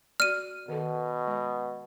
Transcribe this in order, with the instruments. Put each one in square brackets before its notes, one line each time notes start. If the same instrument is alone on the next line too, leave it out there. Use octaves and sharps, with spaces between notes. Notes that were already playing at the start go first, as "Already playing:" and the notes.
[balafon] F#4 D5 [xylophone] F6 D#7
[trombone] B2 [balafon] D#3 A4
[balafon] G#3